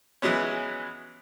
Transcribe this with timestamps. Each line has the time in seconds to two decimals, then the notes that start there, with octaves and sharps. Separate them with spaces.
0.22 E3 F#3 G#3 B3 C#4